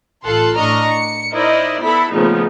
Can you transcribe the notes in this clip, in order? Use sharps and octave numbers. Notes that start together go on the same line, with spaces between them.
A1 F4 A4 C6 F#6 C7
A2 D4 D#5 A#5 C#6 F6
C#7
D#4 E4 A#4 C5 D5 D#5
B3 E4 A4 B5
A#2 C#3 F3 A3 B3 D#4